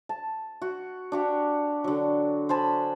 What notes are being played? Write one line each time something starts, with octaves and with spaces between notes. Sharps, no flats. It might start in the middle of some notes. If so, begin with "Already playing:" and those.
A5
F#4
D4 F#4 G4
D3 F#3
C5 G#5 A5 B5